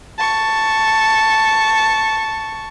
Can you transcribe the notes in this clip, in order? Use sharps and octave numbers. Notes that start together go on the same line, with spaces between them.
A5 C#6